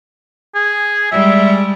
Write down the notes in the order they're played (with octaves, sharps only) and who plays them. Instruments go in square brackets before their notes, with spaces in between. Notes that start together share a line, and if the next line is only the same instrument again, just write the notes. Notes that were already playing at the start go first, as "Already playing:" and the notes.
[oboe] G#4
[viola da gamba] G3 G#3 [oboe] E5